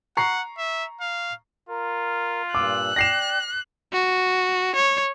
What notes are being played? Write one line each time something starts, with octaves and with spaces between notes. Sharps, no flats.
F#5 A#5 C#6 C7
E5
F5
F4 A#4
G2 A#2 D6 E6 F#6
D5 G5 A#6 C7 E7
F#4
C#5